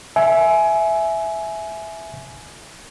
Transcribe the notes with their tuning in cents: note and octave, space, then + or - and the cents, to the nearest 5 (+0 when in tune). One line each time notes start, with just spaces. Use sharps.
E5 +0 G#5 +20